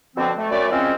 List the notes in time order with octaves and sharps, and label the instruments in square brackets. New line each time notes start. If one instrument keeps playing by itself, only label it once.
[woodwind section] B2 D3 F3 C4
A3
F#2 A3 D5
F3 G#3 C4 C#4